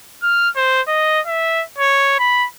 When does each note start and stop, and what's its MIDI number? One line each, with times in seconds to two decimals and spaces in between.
0.22 0.49 89
0.56 0.81 72
0.88 1.20 75
1.27 1.64 76
1.78 2.15 73
2.19 2.47 83